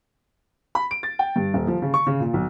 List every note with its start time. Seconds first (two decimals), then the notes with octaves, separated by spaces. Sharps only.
0.75 B5
0.91 D7
1.03 A6
1.19 G5
1.36 G2
1.54 D#1
1.67 F3
1.82 C#3
1.94 C#6
2.06 C#3
2.20 A#2
2.33 B1